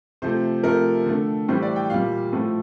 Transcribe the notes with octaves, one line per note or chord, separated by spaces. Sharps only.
C3 F3 A3 C5
C3 F3 A3 A#4
D3 A3
A2 E3 G3 C5
D5
G5
A#2 G3 F5
A2 F3 A3